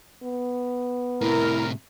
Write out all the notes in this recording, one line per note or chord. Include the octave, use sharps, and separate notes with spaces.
B3
A2 C3 E4 A#4